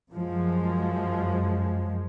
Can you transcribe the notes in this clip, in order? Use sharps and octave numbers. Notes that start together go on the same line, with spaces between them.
F#2 F3 G#3